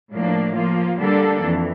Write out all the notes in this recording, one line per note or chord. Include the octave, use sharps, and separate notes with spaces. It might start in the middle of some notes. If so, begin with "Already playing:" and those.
A2 F3 A#3 D4
F3 A#3 F4
D3 G3 A#3 D4 A4
F2 E3